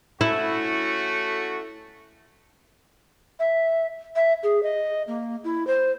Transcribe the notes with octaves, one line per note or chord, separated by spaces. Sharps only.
A3 C#4 E4 F#4
E5
E5
G#4
D#5
A#3
E4
C5